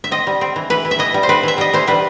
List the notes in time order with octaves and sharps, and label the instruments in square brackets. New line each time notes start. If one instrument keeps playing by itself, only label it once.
[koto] E5
C4 D#5
G3
C4
E3
E3 B4
E3
E5
E3 D#5
G3
C5
C4 B4
E3 E5
G3 D#5
E3 C5
G3 B4